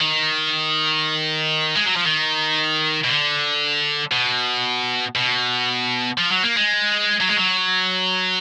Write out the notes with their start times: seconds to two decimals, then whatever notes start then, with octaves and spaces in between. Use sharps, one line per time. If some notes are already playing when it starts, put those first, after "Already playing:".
0.01 D#3
1.76 G#3
1.86 F#3
1.96 F3
2.06 D#3
3.04 B2
3.09 D3
4.12 B2
5.15 B2
6.18 F3
6.31 F#3
6.43 A#3
6.57 G#3
7.21 F#3
7.29 G#3
7.37 F#3